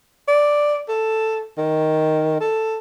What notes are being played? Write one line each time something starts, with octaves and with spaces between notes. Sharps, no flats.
D5
A4
D#3
A4